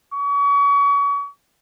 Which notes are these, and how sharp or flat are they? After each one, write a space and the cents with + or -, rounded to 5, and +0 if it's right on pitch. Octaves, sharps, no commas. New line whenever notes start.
C#6 +35